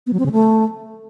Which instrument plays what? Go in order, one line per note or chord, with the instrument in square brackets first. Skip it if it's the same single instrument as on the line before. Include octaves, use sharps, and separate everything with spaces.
[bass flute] B3
F#3
C4
C#3
A3